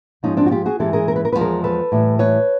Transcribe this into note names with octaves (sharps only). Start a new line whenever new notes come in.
G#2 F3 G#3 C#4 D#4
C4 D4
F#4
F4 G4
F#4 G#4
G#2 E3 G#3 G4 A4
G#4 A#4
A#4
B4
A#4
E2 C3 F3 G#3 B4
G#4 A#4
A4 B4
A2 E3 G3
B4 C#5